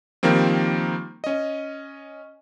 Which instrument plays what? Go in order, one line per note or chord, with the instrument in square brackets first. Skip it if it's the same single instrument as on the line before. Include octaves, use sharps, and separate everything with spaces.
[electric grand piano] D#3 F3 G3 A#3 C4
C#4 D#5